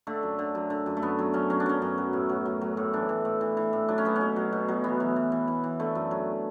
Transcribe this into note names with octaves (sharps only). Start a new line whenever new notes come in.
D3 A3
F#2
D3
F#2
D3
F#2
A3
F#2 B3
F#3
F#2 C#4
F#3 C#4
D4
F#2 C#4
F#2
F#3
A2
F#3
F#3
F#3
A2
E3 D4
E3
A2
E3
E3
A2
F#3 D4
C#4
F#3 B3
C#4
B2
F#3
B2
F#3
E3 B3
E3
E3
E3
E3
E3
D3 A3
F#2
F#3